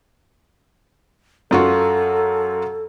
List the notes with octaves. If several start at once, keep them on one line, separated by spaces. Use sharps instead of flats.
F#2 F4 F#4 A4